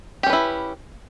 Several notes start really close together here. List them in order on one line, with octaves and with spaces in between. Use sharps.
G4 C#4 B4 E4